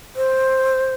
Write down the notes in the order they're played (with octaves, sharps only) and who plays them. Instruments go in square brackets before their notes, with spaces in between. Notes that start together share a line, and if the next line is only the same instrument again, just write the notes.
[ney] C5